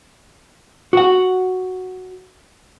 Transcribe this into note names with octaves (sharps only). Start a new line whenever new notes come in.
F#4 F#5